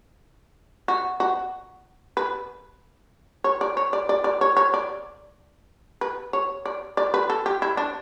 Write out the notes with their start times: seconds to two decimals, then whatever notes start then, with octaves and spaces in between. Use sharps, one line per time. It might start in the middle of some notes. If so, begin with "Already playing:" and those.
0.88 F#4
1.20 F#4
2.17 B4
3.44 C#5
3.61 D5
3.77 C#5
3.93 D5
4.09 D5
4.24 D5
4.41 C#5
4.57 C#5
4.74 D5
6.01 B4
6.33 C#5
6.65 D5
6.97 D5
7.14 B4
7.30 A4
7.46 G4
7.62 E4
7.77 D4